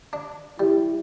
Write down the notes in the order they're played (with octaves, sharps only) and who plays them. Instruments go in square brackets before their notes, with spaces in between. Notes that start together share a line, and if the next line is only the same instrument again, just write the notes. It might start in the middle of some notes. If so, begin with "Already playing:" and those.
[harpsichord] D4
[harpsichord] G3 [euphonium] E4